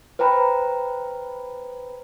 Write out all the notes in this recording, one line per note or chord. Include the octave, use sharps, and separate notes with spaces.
B4 C5 G5 A#5 B5